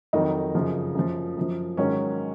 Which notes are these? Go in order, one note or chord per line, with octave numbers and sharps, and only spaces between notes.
F2 D#3 F#3 D#4
F#2 C#3 F3
F#2 F3
F#2 F3
G#2 D#3 F#3 C#4